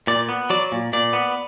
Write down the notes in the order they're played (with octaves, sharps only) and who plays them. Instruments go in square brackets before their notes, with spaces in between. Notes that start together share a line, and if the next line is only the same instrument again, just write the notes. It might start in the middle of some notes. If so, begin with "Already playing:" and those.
[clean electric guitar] A#2 D5
B3
F#3 D5
A#2
A#2 D5
B3